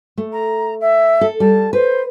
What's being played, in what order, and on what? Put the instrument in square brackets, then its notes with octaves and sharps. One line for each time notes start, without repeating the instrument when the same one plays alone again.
[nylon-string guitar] A3
[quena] A#5
E5
[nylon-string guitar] A4
[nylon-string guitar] G3 [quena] A5
[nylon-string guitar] B4 [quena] C5